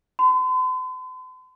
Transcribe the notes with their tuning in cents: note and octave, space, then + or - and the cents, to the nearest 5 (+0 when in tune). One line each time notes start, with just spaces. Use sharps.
A5 +0 C6 -45